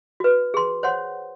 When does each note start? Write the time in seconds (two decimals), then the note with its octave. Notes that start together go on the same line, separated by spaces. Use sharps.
0.20 F#4 B4
0.54 G#4 C6
0.83 C5 C#5 F#5 C6